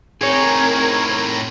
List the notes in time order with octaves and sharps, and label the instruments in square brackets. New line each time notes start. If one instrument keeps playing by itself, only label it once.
[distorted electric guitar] A2 D#4 [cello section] C4 A#4 [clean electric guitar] G#4 C#5 [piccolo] G#6